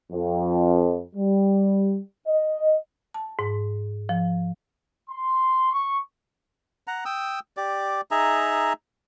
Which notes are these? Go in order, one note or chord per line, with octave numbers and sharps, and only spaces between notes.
F2
G3
D#5
A5
G#2
F3
C6
C#6
F#5 A#5
G5 D#6 E6
G4 D5
D#4 G#4 E5 A#5